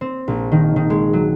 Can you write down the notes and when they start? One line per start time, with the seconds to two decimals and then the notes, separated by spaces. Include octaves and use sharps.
0.01 C4
0.28 A#1
0.52 D#3
0.76 D#3
0.90 G#3
1.13 F#3